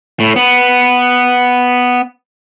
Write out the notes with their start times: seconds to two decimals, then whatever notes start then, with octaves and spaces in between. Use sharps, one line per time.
0.20 A2
0.36 B3